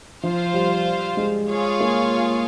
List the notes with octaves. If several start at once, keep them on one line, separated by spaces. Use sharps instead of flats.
F3 F4 C5 F5
G3
G#3
F4 G#4 C#5 F5
A#3